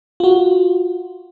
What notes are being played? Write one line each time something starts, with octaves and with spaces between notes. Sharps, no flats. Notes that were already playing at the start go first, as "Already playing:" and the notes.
F4 F#4